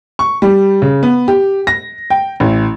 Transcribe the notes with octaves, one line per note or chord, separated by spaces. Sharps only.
C#6
G3
C#3
B3
G4
A#6
G5
A1